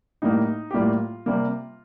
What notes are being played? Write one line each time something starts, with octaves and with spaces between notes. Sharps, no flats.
A2 G3 A#3 D#4
G4
A2 G3 A#3 F4
C3 G3 A#3